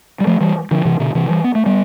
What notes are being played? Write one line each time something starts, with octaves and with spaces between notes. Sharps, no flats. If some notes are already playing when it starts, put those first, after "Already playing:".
G3
F3 A3
E3 G3
D3 F3
C3 E3
B2 D3
C3 E3
E3 G3
B3
A3
G3 B3